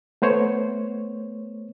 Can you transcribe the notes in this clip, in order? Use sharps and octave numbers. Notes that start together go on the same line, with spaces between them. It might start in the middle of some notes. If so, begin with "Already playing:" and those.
A3 B3 C5 C#5